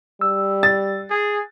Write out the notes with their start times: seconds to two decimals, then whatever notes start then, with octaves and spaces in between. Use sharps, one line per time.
0.21 G3 E6
0.63 A6
1.10 G#4